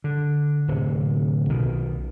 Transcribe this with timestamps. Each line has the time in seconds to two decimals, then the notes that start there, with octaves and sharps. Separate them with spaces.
0.04 D3
0.68 D1 C3
1.49 B1 B2 D#3